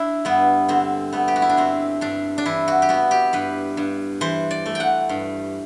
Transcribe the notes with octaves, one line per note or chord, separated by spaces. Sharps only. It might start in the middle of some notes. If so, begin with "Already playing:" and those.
Already playing: D4 E4
G2 B3
D3 C4
A3 B3
G4
F#4
E4
D4
G2 C4
G2 D4
D4
E3 E4
F#4
G4
B3 F#4
G4
G2 B4
G2
E3 C5
D5
A3
F#5 G5
G2